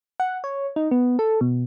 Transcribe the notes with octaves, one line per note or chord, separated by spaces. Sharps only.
F#5
C#5
D#4
B3
A4
B2